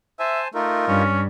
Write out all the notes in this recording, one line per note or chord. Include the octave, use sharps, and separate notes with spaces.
C5 E5 G#5 A5
A3 D#4 F4 A#4
G2 C#4